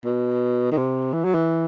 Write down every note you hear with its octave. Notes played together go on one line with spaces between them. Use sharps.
B2
D#3
C3
E3
F#3
E3